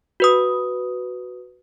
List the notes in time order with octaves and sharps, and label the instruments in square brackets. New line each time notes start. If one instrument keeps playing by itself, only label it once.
[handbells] F#4 B4 D#6